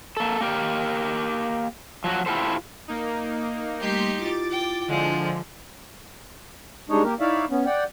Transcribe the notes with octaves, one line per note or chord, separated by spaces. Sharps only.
A#3 A4
A#3 G4 A#4
F3 F#3 F#4
E4 F4 G4 A4 C5
A#3 D#4
G3 A3 A#3 D#4 G4 C6 G6 B6
E4 F4 D6 A6
G5
D3 F3 G#3
G3 G#3 D4 D#4 C#5 D#5
A#3 G4 A#4
D#4 E4 C#5 D5 E5 F5
B3 C#4
D5 F#5 G5